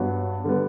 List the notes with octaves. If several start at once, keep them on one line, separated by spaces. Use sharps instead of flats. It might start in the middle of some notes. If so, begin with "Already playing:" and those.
Already playing: G2 F#3 B3 F#4
D3 G3 B3